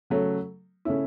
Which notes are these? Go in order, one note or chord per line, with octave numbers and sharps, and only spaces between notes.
C#3 F#3 A3
C#3 A3 C#4 E4